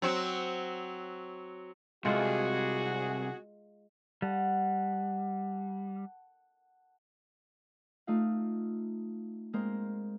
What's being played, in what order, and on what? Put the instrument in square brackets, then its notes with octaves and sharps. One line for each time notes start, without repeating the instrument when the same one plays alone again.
[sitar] F#3 C4 F#4
[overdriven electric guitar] C2 [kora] G#3 F4 A4 [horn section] F#4 G#4
[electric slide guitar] G3 [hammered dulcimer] F#5 A5
[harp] A3 D#4 F4 F5
G#3 A#3 C4 A#4 C5